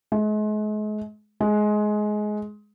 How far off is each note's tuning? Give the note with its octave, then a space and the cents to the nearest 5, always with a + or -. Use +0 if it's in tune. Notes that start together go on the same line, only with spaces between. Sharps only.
G#3 +40
G#3 +20